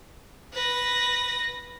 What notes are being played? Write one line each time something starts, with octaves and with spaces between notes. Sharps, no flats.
B4 A#6